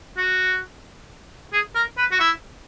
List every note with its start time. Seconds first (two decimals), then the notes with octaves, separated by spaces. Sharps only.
0.17 F#4
1.53 G#4
1.75 A#4
1.98 B4
2.11 F#4
2.20 E4